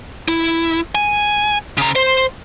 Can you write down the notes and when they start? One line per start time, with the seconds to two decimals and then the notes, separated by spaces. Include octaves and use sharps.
0.28 E4
0.95 G#5
1.78 C#3 A#5
1.96 C5